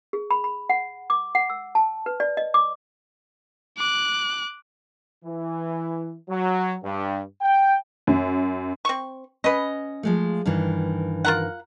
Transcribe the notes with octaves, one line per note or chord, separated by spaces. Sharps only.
G#4
B5
B5
F#5
D6
F#5
E6
A5
B4
D5
D#5
D6
D6 F#6
E3
F#3
G2
G5
F#2
C4 C#6
C#4 B4 D#5
F3 G#3 A3
G2 D#3 E3
F4 A#4 F#5